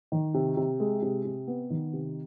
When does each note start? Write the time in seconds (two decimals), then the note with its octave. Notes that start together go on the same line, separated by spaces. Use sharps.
0.12 D#3
0.34 C3
0.57 C3
0.80 G#3
1.02 C3
1.25 C3
1.47 B3
1.70 D#3
1.93 C3